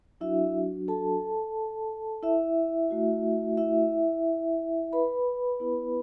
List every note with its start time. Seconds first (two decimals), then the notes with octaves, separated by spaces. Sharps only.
0.21 F#3 D4 E4 F#4 E5
0.88 A4 A5
2.23 E4 E5
2.90 A3 F#4
3.57 E4 E5
4.93 B4 B5
5.60 B3 E4